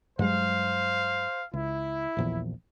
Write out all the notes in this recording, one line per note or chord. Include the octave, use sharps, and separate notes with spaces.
G2 F#3 G#3 C5 F5
C#2 E4
D#1 A#1 E2